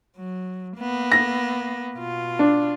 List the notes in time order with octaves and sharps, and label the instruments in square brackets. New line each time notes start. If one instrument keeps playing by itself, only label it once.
[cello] F#3
A#3 B3
[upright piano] A#6
[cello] B2 F4
[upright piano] D4